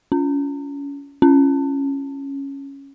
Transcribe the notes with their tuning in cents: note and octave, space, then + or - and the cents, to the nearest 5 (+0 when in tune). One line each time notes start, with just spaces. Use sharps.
C#4 +30
C#4 -5